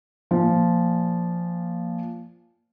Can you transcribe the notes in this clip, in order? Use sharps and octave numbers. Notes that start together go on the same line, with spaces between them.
A#2 F3